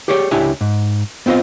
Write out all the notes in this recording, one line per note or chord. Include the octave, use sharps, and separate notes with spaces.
G4 G#4 C#5 D5 F#5 G5
C#2 D4 E4 G4 G#5
G#2
B3 C4 F4 C5 D#5